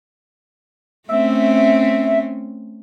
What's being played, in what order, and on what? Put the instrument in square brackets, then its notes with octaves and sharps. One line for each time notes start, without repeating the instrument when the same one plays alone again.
[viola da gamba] A3 C4 C#4 [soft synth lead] E5